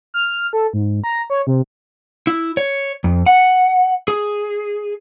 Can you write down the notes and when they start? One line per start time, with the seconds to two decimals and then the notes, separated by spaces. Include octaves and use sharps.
0.14 F6
0.53 A4
0.73 G#2
1.04 A#5
1.30 C#5
1.47 C3
2.27 E4
2.57 C#5
3.04 F2
3.26 F#5
4.08 G#4